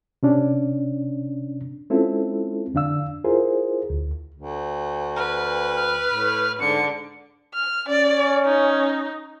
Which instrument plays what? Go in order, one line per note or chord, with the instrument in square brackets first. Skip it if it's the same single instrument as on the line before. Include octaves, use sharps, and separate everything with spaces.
[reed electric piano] C3 C#4 D4
G#3 C4 C#4 E4 F4 A4
F2 D3 D4 F5 E6
E4 F4 G#4 A#4 C5
D2
[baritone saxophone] D2
[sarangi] B4 [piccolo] F6
[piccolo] F6
[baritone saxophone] A2
[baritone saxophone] G#2 [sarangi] D3 [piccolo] C#7
[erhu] F6
[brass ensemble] C#4 [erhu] D5
[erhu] D#4